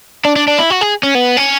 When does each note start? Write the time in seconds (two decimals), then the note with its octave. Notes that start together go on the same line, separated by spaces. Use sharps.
0.25 D4
0.36 D4
0.47 D4
0.58 E4
0.70 F#4
0.81 G#4
1.03 C#4
1.15 B3
1.37 C#4